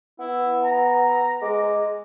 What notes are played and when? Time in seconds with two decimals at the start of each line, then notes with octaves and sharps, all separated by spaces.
0.19 B3 E4
0.63 A#5
1.42 G#3 D6